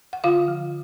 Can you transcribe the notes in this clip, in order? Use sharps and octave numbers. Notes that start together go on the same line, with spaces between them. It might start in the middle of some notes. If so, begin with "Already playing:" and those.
F#5
D3 F4 F5
F3